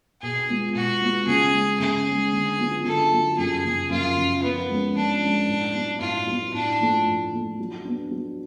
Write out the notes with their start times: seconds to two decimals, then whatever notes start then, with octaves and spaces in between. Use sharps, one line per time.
0.21 B2 G#4
0.49 G#3 B3 F4
0.75 B2 F#4
1.01 G#3 B3 F4
1.27 C#3 G#4
1.54 G#3 C#4
1.80 C#3 G#4
2.06 C#4
2.11 G#3
2.32 D3
2.59 F#3 B3 F4
2.85 D3 A4
3.12 F#3 B3 F4
3.38 F#2 G#4
3.64 C#3 F3
3.90 F#2 F4
4.17 C#3 F3
4.42 F3 B3
4.70 G#3 C#4
4.95 F3 D4
5.21 G#3 C#4
5.48 A2
5.74 F#3 B3
6.01 A2 F4
6.27 F#3 B3
6.53 A2 D4
6.80 F3 A3
7.06 A2
7.32 F3 A3
7.59 F#3
7.85 B3 D4
8.11 F#3